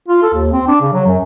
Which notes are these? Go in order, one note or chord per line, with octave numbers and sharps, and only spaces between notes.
F4
A4
D#2
C4
D4
C#3
F#3
F#2